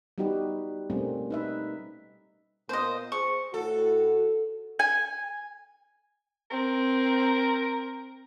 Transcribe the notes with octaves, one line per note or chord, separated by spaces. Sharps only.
G3 B3 D#4 F#4 G4 B4
B2 G3 A3 A#3 C4 C#4
D#4 B4 E5
A#2 B3 C5 D#5
G#4 C5 C#6
A2 F#4 A4
G#5
C4 A#4